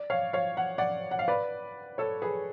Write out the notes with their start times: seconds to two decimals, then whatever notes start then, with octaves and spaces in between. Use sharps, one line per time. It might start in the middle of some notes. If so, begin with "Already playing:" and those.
Already playing: D5
0.10 C#5 F5
0.33 C#5 F5
0.57 F#5
0.78 D5 F#5
1.11 F#5
1.19 F5
1.28 B4 D5
1.98 A4 C#5
2.22 G#4 B4